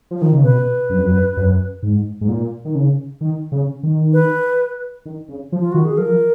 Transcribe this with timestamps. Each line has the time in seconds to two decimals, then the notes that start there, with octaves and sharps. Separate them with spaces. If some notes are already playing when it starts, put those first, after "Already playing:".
0.11 F3
0.22 D#3
0.33 C#3
0.44 B2 B4
0.90 F#2
0.98 F2
1.06 F#2
1.37 F#2
1.83 G#2
2.21 G#2
2.28 A#2
2.65 D#3
2.75 C#3
3.21 D#3
3.52 C#3
3.83 D#3
4.13 B4
5.06 D#3
5.29 C#3
5.52 F3
5.60 F4
5.72 D#3 F#4
5.85 G#4
5.98 F3 A#4